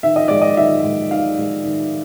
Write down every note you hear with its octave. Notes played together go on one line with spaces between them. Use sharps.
D#3 E5
D#5
G#3 D5
D#5
D#3 E5
G#3
D#3 F5
G#3
D#3